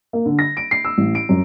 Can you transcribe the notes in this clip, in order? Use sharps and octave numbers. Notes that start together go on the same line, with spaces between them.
A#3
D3
A#6
D7
C7
E6
A1
D7
F#2